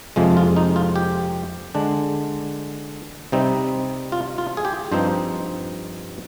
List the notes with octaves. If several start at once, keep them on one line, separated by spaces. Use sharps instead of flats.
F2 C3 F3 G#3
F4
D#4
F4
G4
D3 G#3 D4
C3 G3 C4 D#4
F4
F4
G#4
G4
G2 F3 C4 D#4 C5